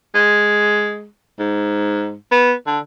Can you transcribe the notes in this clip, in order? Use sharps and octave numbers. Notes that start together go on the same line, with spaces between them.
G#3
G#2
B3
D3